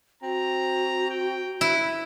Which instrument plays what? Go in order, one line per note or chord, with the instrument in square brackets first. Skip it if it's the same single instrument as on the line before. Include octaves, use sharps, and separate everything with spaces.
[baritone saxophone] C4 [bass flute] F#4 [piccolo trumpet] A#5
[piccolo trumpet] G5
[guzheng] E4 [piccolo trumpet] B4